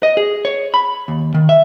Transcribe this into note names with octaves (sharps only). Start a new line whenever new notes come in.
D#5
G#4
C#5
B5
D#2
D#3
E5